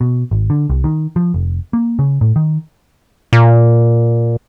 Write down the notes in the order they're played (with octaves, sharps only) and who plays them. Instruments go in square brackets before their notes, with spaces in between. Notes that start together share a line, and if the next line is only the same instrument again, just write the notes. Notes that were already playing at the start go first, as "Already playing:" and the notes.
[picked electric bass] B2
G#1
D3
C2
D#3
F3
F1
A#3
C#3
A2
D#3
[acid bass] A#2